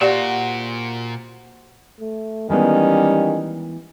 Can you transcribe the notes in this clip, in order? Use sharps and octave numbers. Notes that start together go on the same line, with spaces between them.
A#2 F#4 G4 C5 D5 F5 F#5
A3
D#3 E3 G3 G#3 B3 C#4